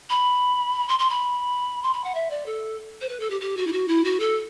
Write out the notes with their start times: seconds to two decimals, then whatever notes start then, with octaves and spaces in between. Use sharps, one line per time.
0.10 B5
0.89 C6
0.99 C6
1.10 B5
1.83 C6
1.93 B5
2.04 F#5
2.15 E5
2.30 D5
2.46 A4
3.01 C5
3.09 B4
3.20 A4
3.30 G4
3.41 G4
3.57 F#4
3.67 E4
3.72 F#4
3.88 E4
4.04 F#4
4.20 A4